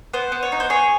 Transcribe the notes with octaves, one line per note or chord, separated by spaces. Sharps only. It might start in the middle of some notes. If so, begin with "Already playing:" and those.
B3 C5
B3
C#5
D#4
C5
G#4 C#5